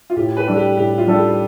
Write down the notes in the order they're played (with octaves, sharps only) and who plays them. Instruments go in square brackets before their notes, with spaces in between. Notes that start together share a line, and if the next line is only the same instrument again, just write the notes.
[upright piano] F4
[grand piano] A2 [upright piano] G4
[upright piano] G4 B4
[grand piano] G3 D4 A4
[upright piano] G4
[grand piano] A2 [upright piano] G4
[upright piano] F4
[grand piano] G3 D4 A4
[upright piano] G4